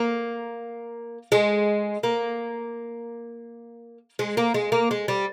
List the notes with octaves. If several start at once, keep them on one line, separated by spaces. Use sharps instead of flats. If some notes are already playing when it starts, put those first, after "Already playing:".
Already playing: A#3
G#3
A#3
G#3
A#3
G#3
A#3
G#3
G3